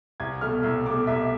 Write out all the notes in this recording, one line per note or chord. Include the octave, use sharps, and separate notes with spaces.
C2 G#6
B2 A3 F6
C2 E6
B2 A3 D6
C2 E5
E5